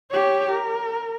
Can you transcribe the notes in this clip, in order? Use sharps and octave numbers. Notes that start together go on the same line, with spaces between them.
G4 C#5
A#4